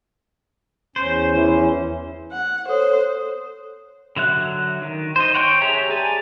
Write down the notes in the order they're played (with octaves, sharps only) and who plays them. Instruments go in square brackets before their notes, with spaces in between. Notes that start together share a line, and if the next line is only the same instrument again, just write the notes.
[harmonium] E2 C#4 [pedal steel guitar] C5
[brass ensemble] E3
[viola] F#5
[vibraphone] A4 C#5 D#6 [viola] C5
[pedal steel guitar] D3 F#3 E5 F#6
D#3
C5 D#5
C#5 F#5 G5 C6 C#6
G4 G#4 C#5 E5 A#5
G4 G#4 D5 G#5 A5